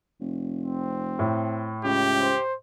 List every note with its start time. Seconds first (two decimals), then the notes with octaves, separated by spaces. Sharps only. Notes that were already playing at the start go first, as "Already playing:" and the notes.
0.20 F1
0.61 C4
1.19 A2
1.85 C#2 G4
2.22 C5